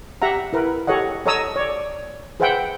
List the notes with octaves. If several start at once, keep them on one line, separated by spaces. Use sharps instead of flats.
G4 E5 F#5 A#5
E4 A#4 B4
G4 A4 C#5 D#5 F#5
A4 C#5 D#5 A#5 D#6 E6
C#5 D5
G#4 B4 C5 E5 F#5 G5